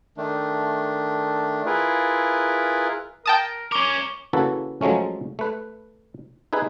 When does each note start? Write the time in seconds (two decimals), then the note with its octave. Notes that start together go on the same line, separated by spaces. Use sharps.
0.17 D#3 A3 D4
1.66 E4 F4 G#4 A#4 B4
3.26 A#4 G5 A5 D#6
3.72 C#4 A#4 C#6 D6 G7
4.33 C#3 E3 A#3 E4 F#4 A4
4.81 F3 F#3 G#3 A3 C#4
5.39 A3 B4
6.53 D#4 E4 G#4 B4